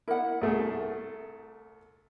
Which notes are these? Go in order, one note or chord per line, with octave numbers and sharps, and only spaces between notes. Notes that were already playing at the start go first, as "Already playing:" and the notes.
E4 A#4 F#5
C2 A3 G#4